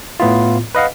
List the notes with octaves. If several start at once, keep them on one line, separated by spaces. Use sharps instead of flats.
A2 B3 E4 F4
B4 D#5 F5 F#5